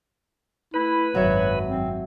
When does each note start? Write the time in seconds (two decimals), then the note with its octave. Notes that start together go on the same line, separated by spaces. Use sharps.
0.74 A3 E4 B4
1.15 G#1 F#2 F#3 C#5 E5
1.67 C4